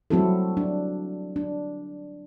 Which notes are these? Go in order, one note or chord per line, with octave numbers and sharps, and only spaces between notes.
F#3 G3 C4 E4 F#4 A4
D4
D4